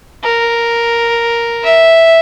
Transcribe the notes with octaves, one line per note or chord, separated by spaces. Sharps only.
A#4
E5